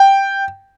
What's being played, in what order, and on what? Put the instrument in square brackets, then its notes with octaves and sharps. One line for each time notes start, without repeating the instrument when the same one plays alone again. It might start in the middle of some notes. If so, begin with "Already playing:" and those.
Already playing: [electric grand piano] G5